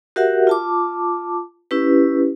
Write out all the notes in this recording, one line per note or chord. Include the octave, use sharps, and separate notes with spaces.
F#4 G4 A#4 E5 F#5
F4 A5 D6
C#4 E4 G4 B4